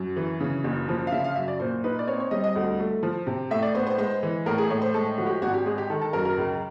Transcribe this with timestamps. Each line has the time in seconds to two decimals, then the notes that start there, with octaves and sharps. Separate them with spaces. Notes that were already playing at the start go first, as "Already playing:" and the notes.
Already playing: F#2
0.16 E3
0.40 C#3
0.64 F#1
0.89 F3
1.07 F5
1.12 C#3 E5
1.24 F5
1.36 F#2 E5
1.48 D5
1.60 A#2 C5
1.84 D#4 B4
1.99 D5
2.07 C4 C#5
2.20 C#5
2.31 G3 D#5
2.44 D#5
2.56 D2
2.79 A3
3.03 F3
3.27 C3
3.51 A2 E5
3.63 D5
3.75 B3 C5
3.87 C5
3.98 G#3 C5
4.23 E3
4.46 A2 A#4
4.58 G#4
4.70 A2 C#5
4.82 C5
4.94 G#3 A4
5.18 F3 F#4
5.26 G4
5.42 G#1 F#4
5.54 G4
5.65 G#3 G#4
5.78 G4
5.90 D#3 A4
6.02 A4
6.13 F#2 A#4
6.25 A#4
6.37 C#2